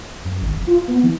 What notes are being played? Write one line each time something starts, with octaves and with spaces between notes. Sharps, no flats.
F#2
G#1
F1
F4
B3
E3